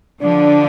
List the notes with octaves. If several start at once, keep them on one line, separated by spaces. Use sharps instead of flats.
D3 F3 D4